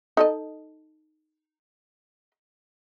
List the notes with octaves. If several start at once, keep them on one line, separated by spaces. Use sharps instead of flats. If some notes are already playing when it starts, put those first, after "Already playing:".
D#4 A4 D#5